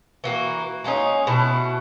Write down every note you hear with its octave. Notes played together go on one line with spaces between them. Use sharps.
E3 A#3 F#4
G#3 A#3 C#4 D#4
B2 A3 E4